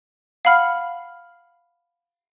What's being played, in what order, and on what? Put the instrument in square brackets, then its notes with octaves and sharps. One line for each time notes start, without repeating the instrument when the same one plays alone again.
[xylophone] F5 F#5 B5 F6